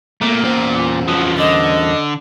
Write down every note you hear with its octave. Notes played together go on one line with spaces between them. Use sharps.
A#2 A3 A#3
E2 C#4 C5
F3 F#3
D3 D#5